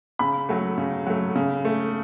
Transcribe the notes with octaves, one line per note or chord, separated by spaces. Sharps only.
C#3 B5
F#3 A3
C#3
F#3 A3
C#3
A3